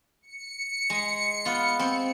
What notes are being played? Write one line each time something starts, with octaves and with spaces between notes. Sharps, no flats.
C#7
G#3
B3 F4
C4